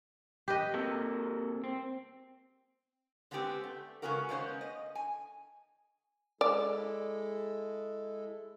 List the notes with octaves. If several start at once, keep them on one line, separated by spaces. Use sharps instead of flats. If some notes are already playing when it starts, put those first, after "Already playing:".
G4 B4 D#5
C3 A#3 A4
C4
D3 G#3 B3 C4 G4 C5
A3
C#3 G#3 B3 C#4 F#4 A#4
G#3 A#3 B3 C#4 D4 C5
D#5
G#5
G#3 E4 A4 D5